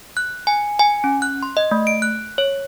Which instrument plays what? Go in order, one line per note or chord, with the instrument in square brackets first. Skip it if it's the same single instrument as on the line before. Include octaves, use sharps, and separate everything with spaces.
[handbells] F#6
G#5
G#5
C#4
F#6
C6
D#5
A3
D7
F#6
C#5